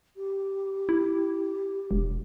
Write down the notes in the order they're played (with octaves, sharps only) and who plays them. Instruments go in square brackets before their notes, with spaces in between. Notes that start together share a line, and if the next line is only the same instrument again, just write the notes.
[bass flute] G4
[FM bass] E4
E1